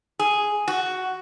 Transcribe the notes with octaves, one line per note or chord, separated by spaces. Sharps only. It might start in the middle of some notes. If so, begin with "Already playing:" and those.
G#4
F#4